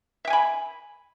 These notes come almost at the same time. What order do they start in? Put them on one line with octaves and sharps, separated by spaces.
E5 G5 G#5 B5